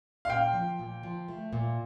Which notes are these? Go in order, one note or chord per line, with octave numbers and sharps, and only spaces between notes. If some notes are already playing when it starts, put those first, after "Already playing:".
F5
A#2 G5
F3
A#2
F3
A3
A#2